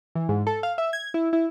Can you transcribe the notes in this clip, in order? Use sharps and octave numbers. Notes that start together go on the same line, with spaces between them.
E3
G#2
A4
F5
E5
G#6
E4
E4